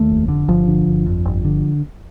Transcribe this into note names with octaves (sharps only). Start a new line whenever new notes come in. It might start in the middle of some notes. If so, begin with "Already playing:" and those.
Already playing: D#2 A3
F1
D3
G1 F3
D3
G1
F2
G1
D3